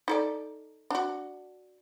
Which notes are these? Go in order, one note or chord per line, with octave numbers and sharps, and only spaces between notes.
D#4 A4 D5
D4 F#4